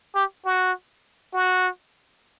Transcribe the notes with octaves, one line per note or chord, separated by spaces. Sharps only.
G4
F#4
F#4